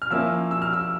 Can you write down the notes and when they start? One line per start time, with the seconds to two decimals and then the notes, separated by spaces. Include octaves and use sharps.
0.02 F6
0.10 F3 A#3 C#4 E4 E6
0.51 E6
0.62 F6
0.73 E6